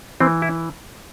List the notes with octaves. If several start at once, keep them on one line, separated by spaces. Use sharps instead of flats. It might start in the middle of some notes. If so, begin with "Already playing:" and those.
E3 C4
E4